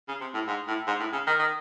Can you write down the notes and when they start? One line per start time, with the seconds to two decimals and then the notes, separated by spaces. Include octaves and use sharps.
0.08 C#3
0.21 C3
0.34 A2
0.48 G#2
0.68 A2
0.87 G#2
1.00 A2
1.13 C#3
1.27 D#3
1.39 D#3